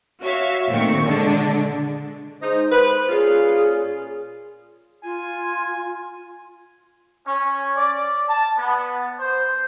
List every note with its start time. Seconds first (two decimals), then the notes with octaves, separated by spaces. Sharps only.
0.21 F#4 C#5 E5 F5
0.69 A#2 D#3 A3 C4 C#6
1.03 D3 G#3 D4
2.42 G#3 D#4 C5
2.72 B4
3.09 A#2 C#4 F4 G#4
5.04 F4 G#5
7.27 C#4
7.77 D5
8.29 A5
8.58 B3
9.19 C5